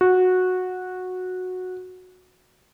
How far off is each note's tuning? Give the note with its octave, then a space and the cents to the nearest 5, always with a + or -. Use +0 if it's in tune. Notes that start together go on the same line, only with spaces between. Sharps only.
F#4 -10